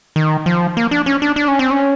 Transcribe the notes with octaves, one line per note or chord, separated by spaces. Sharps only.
D#3
F3
A#3
D4
C#4
D4
D4
C#4
C4
C#4